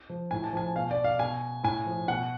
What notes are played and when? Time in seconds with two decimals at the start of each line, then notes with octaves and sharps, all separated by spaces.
0.10 F3
0.31 A2 G#5
0.44 A5
0.53 F3 G#5
0.76 B2 F5
0.91 D5
1.04 F5
1.19 B2 G#5
1.63 A2 G#5
1.86 F3
2.08 B2 F#5